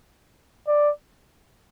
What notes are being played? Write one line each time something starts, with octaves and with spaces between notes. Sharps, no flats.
D5